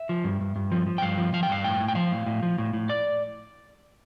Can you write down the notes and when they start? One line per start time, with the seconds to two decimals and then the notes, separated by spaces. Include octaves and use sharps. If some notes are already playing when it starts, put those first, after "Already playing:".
Already playing: E5
0.09 F3
0.24 G2
0.41 G2
0.56 G2
0.72 F3
0.87 F3
0.98 G5
1.02 G2 F5
1.18 F3
1.33 F3 F5
1.43 G5
1.49 G2 F5
1.64 A2 G5
1.80 A2
1.88 G5
1.95 F3 F5
2.11 A2
2.26 A2
2.43 F3
2.58 A2
2.74 A2
2.89 D5